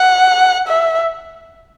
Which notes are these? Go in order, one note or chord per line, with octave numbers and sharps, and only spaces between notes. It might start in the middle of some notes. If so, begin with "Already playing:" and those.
Already playing: F#5
E5